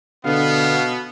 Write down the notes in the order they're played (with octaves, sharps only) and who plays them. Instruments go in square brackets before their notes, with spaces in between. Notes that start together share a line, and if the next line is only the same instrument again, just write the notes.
[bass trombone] B2 [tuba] D3 [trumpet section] B3 [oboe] F5